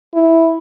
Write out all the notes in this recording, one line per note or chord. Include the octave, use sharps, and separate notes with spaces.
E4